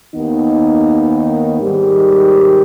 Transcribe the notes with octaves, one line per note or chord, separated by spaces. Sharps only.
D#2 D#3 B3 D#4
G#2 D#3 G3